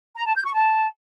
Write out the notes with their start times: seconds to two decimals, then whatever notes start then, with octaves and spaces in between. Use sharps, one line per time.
0.16 A#5
0.26 A5
0.36 G6
0.45 C#6
0.55 A5